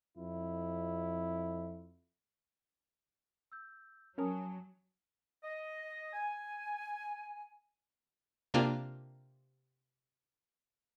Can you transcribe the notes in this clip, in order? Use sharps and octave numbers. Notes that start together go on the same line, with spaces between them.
F2 E4
E6 G6
F#3 C#4 A#4 G#5 A5 D#6
D#5
G#5
C3 A#3 C4 D4 F4